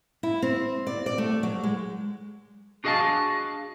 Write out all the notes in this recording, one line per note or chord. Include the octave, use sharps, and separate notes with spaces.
E4
C4
D5
D5
A3
F#3
G#3
D4 F#4 G#4 D#5 F5 A5